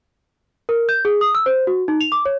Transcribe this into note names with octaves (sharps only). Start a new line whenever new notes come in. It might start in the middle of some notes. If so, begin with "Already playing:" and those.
A#4
G6
G#4
D#6
E6
C5
F#4
D#4
F7
D6
C#5